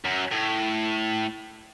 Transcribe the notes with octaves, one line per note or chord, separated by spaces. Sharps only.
F#2
A2